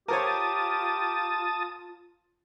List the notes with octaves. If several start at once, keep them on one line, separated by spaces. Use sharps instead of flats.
F4 G4 A#4 C5 C#5 A5 D#6